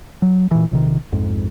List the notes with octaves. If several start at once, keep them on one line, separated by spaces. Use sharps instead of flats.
F#3
A#2 E3
A#1 C3 D#3
A#1 F2 G#2